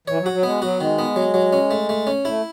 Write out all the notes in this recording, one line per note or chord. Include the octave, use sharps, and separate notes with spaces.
E3 C#5
F#3
F#4
F#3
G#3 B3
F#3 F#4
D#3 G#3
B3
F#3
F#3
C#4
A3
A3
C#4
A3 E4